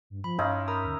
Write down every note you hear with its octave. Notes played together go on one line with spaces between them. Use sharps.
G2
F3 B5
G2 C#4 D#4 E4 F5 C6 G6
A#4 A#5 B5 D#6
D#2 D3